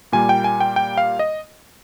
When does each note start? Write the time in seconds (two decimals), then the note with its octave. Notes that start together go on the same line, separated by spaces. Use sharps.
0.12 A#2 G3 A#3 G#5
0.29 G5
0.44 G#5
0.60 G5
0.76 G5
0.97 F5
1.19 D#5